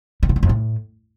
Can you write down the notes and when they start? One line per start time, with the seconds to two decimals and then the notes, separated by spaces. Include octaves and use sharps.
0.23 D3
0.29 C#3
0.36 G2
0.43 F2
0.49 A2